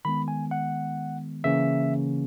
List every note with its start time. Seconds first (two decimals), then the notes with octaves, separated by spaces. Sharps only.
0.05 D#3 G#3 B3 B5
0.28 G#5
0.51 F#5
1.44 C#3 E3 A#3 C#4 E5